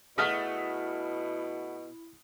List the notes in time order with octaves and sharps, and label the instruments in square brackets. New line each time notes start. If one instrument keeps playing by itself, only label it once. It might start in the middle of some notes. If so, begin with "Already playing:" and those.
[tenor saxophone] B2 [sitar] A3 F#4 G#4 [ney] E4 [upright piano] D#6 F6 B6